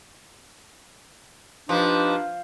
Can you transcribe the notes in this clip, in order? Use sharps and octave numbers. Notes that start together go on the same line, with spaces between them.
F3 D4 D#4 G4 B4